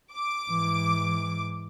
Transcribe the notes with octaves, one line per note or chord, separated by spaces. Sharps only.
D6
G#2 E3